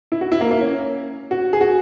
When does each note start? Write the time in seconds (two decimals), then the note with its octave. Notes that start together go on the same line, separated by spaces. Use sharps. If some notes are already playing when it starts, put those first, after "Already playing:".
0.12 E4
0.21 F#4
0.32 E4
0.41 A#3
0.51 A#3
0.61 C#4
1.31 F#4
1.53 G#4
1.61 F#4